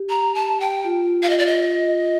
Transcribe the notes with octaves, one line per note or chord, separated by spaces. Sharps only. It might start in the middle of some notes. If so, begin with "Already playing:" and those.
Already playing: G4
A#5
A5
G5
F4
F5
D#5
D5
D#5